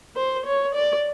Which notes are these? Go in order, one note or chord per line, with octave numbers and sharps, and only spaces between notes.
C5
C#5
D5